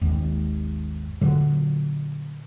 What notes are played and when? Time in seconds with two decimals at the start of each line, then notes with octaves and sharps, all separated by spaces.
0.01 G#1 D#2
1.21 A#2 D3 F#3